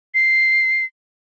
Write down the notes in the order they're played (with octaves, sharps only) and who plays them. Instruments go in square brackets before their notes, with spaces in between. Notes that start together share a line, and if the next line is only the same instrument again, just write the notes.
[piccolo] C7